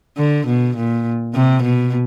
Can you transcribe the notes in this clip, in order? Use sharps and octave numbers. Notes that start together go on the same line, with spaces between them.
D3
B2
A#2
C3
B2